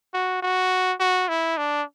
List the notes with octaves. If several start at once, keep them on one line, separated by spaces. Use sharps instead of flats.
F#4
F#4
F#4
E4
D4